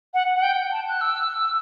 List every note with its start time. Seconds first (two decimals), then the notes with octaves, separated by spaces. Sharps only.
0.14 F#5
0.35 F#5
0.43 G5
0.72 A5
0.89 F#6
1.01 E6